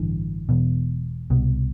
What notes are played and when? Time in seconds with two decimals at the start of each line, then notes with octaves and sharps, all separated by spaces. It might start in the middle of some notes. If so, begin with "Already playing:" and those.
Already playing: A1 G2 D3 E3
0.49 E1 E2 B2
1.30 C2 B2